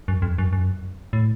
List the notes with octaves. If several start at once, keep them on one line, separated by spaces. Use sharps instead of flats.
F#2
F2
F#2
F#2
A2